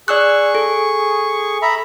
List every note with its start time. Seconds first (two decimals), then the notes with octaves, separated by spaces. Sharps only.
0.08 G#4 D5 C#6 E6 F#6
0.55 A4
1.62 E5 A#5 B5